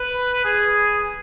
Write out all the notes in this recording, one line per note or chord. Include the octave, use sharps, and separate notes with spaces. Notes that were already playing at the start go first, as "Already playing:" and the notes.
Already playing: B4
G#4